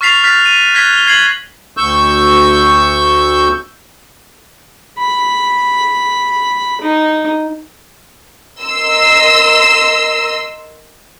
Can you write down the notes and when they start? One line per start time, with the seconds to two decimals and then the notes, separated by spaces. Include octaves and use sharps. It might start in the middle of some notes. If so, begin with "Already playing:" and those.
0.01 C#6 F6 A6 B6 C7 F7
0.24 F6 F#6 A6 B6
0.46 D#7
0.74 F#6 G#6 A#6 B6 G7
0.93 F7 G7
1.07 G#6 C7 F#7
1.77 D2 C#6 E6 G6
4.98 B5
6.81 D#4
8.61 A#4 D#5 C6 E6